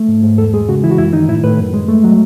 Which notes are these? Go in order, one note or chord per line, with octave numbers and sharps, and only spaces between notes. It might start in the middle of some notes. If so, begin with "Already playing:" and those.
Already playing: A3
G#2
G#2
E2 A4
G#3 G#4
C#3 F#4
E3 E4
F#4
F#2 E4
D#3 D#4
A2 E4
A2 B4
F#2
G#3
A3
F#3